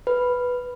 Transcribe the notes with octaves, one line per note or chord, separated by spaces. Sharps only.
B4